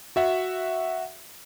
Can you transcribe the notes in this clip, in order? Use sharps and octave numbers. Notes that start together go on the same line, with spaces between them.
F#4 E5 F#5